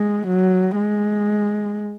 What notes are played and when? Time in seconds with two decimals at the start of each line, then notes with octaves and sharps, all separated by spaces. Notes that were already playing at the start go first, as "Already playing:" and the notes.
Already playing: G#3
0.27 F#3
0.76 G#3